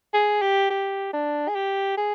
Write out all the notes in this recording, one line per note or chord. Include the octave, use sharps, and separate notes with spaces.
G#4
G4
G4
D4
G#4
G4
G#4